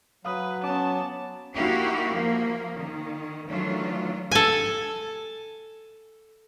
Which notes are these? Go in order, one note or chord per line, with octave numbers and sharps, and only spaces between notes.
F#3 B4 F5 D#6
B3 C#4 A5 D6
A#3 D#4 E4 F#4 G4 F5
F3 A#3
D#3
D#3 E3 F#3 A3 D4 F4
A4 G#5